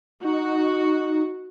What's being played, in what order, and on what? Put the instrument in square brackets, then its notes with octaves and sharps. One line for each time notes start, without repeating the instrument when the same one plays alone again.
[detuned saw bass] D#4 [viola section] F#4